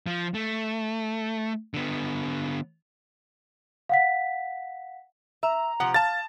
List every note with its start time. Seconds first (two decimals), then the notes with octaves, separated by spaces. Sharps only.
0.07 F3
0.34 A3
1.74 D3 B3
3.89 F5 F#5 B6
5.43 E5 A#5
5.80 C3 F3 F#5
5.94 F5 A5 A6